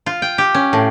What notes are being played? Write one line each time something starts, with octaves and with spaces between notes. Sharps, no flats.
F4
G5
G4
C#4
A2